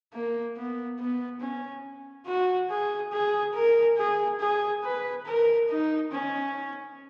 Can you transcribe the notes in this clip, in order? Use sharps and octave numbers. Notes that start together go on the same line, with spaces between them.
A#3
B3
B3
C#4
F#4
G#4
G#4
A#4
G#4
G#4
B4
A#4
D#4
C#4